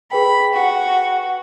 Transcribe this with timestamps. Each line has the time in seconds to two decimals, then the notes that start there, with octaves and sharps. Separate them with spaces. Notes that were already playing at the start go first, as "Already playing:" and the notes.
0.12 G#4 B4 G5 B5
0.54 F#4